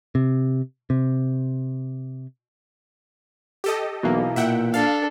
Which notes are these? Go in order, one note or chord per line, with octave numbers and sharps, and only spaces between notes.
C3
C3
G4 A4 D#5
B1 B2 E3 A#3
A#2 E5 F#5 G5
D4 A4 F5